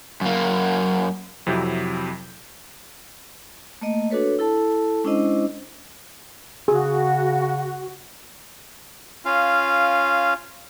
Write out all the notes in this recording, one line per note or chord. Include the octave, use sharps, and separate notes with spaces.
F#2 A#3
F2 C3 F#3 E4 G6
A3 A#3 D#5
D4 F#4 A4 B4 C#5
E4 A4 A5
G#3 C#4 D4 E4 C5 D#5
C#3 F#4 G#4
C#4 F4 F5